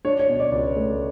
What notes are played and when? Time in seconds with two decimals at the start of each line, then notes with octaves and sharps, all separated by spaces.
0.05 D4 C#5
0.19 C#5
0.29 B2
0.40 D5
0.52 C#2
0.76 A3